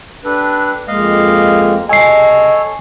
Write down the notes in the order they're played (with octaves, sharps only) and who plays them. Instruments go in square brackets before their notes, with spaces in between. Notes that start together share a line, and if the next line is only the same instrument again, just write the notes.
[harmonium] D4 B4 [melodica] G4 A4
[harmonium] F2 G#3 A#3 [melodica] D#5 F5
[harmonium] C3 [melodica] A4 C#5 [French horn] D#5 [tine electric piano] G#5 C7